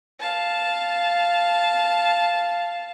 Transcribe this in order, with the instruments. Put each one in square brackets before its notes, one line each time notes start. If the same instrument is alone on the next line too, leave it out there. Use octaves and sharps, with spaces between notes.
[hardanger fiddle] F5 A5